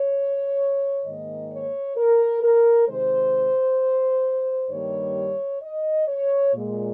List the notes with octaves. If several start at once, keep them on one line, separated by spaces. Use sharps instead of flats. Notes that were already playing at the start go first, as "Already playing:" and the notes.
Already playing: C#5
G#2 D#3 A#3 D#5
C#5
A#4
A#4
C3 D#3 G#3 C5
G2 D#3 G3 A#3 C#5
D#5
C#5
A#2 G#3